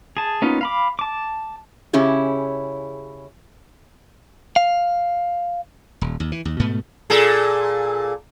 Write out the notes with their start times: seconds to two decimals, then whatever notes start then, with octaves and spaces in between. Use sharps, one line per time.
0.17 G#4 A5
0.42 A#3 B3 C#4 D#4 F4
0.61 F5 B5 D6
0.99 A5 D6
1.93 C#3 C#4 E4 G4 G#4
4.56 F5
6.01 D#1
6.20 D#2
6.32 E3
6.45 D#2
6.60 G#2 B2 A3 B3
7.10 A#2 G#4 A4